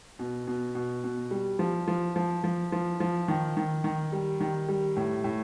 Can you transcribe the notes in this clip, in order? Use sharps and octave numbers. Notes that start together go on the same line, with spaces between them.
B2
B2
B2
B2
G3
F3
F3
F3
F3
F3
F3
D#3
D#3
D#3
G3
D#3
G3
A2
A2